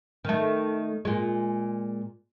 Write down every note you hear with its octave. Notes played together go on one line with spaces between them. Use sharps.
D#3 A3
A#2 G#3